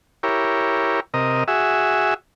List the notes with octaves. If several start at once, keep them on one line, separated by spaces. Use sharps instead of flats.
E4 G4 A#4 C#5
C3 A#4 D#5
F#4 G#4 E5